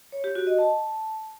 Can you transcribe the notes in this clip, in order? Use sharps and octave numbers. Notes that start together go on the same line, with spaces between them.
C#5
G4
F#4
D#5
A5